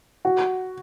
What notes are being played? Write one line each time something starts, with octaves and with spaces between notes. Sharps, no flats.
F#4